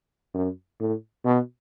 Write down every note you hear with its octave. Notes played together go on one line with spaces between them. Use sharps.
F#2
A2
B2